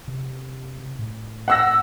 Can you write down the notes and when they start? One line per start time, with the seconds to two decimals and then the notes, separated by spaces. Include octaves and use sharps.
0.08 C3
0.99 A2
1.48 F#5 E6 A#6